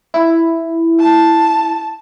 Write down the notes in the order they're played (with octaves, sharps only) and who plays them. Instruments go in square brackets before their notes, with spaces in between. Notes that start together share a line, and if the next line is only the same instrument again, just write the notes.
[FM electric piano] E4
[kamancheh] A5